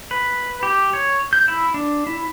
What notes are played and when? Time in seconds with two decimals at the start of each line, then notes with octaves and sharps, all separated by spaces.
0.11 B4
0.63 G4
0.93 C#5
1.33 G6
1.48 E4
1.74 D4
2.07 E4